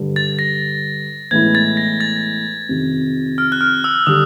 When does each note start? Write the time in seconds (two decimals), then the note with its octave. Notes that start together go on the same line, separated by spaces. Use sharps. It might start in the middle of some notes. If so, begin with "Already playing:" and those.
Already playing: G2 D3 G3
0.16 A6
0.39 A#6
1.31 A2 E3 G#3 B3 E4 G#6
1.55 A6
1.77 A#6
2.00 A6
2.69 F2 C3 D#3
3.38 F6
3.52 F#6
3.61 F6
3.84 E6
4.07 D3 G3 D#6